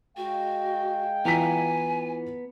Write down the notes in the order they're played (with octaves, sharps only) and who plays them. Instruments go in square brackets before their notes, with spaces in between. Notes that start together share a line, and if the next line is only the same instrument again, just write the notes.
[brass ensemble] G#3 F5 G5 [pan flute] F#4
[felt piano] E3 F4 B6 [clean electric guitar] B3 A#5 [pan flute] G#5